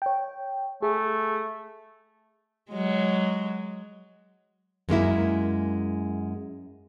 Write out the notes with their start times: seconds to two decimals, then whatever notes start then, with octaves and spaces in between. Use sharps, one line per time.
0.02 C#5 G5
0.82 A3 G#4
2.72 F#3 G#3
4.89 F#2 G#3 A#3 E4